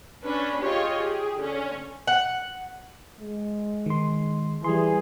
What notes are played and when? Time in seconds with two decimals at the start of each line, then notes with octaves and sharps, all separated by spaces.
0.24 C#4 D4 B4
0.61 F4 G4 G#4 C#5 D#5
0.98 G4 G#4
1.39 D3 C#4
2.07 F#5
3.20 G#3
3.86 D#3 C6
4.64 E3 G3 G#4 C6